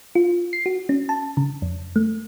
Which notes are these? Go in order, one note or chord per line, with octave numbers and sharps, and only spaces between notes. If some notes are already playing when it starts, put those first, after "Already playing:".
F4
C7
F#4
C#4
A5
C#3
F2
A3